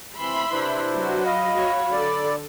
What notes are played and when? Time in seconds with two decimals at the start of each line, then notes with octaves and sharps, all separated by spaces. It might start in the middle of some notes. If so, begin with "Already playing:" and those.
0.17 C3 E3 E5 B5 C6
0.51 C3 D4 E4 B4 C5
0.93 F#3 F#4
1.24 D#5 F5 B5
1.54 F#3 F#4 C#5
1.92 D3 A4 D5